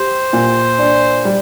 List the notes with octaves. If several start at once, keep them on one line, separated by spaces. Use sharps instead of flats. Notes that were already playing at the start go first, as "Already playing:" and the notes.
Already playing: G4 C5
A#2
D4
G3